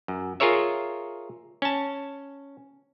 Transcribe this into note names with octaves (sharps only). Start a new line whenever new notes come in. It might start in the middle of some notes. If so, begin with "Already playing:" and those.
F#2
F4 G#4 A#4 C#5 E5
C#4 A5